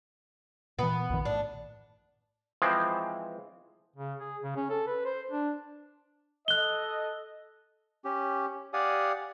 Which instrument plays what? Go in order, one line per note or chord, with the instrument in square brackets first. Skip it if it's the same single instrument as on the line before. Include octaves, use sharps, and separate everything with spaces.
[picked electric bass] A#2 E3 [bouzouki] B3
[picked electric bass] A#1 F#2 D#3
[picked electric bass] A2 [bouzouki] D4
[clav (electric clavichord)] E3 F3 G#3 C4
[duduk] C#3
G#4
C#3
C#4
A4
B4
C5
D4
[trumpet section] A4 D#5 [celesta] F#6 G7
[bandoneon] C#4 G4
G4 D5 F5 F#5 G#5 D#6